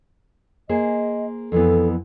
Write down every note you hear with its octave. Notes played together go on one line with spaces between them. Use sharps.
A#3 G#4 C5 D#5
F2 E3 B3 A4